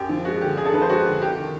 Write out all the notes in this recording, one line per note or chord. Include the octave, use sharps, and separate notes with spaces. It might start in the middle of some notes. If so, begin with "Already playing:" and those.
Already playing: F#2 G4
F3
G#3 F#4
D3 G4
F#2 G#4
A4
F3 B4
C5
G#3 F#4
D3
C2 G4
D#3